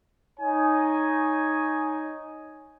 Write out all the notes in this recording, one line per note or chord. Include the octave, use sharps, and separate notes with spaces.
D#4 C#5 G#5